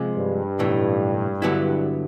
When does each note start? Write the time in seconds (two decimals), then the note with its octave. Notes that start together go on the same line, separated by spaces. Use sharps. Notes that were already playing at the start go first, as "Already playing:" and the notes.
Already playing: C3 F3 G#3
0.17 G2
0.59 B1 A2 E3
1.42 D3 F#3 B3 E4